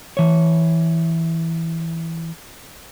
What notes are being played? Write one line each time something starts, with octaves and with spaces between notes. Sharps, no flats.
E3 C#5